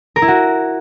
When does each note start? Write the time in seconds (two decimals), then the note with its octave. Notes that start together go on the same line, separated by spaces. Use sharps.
0.16 A#4
0.22 E4
0.28 F#4